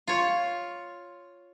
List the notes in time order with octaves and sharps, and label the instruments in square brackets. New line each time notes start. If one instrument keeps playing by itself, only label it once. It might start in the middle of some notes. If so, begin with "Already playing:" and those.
[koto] F4 C#5